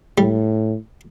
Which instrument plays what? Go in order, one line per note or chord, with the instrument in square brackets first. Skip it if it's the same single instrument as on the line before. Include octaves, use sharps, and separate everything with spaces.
[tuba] A2 [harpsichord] G3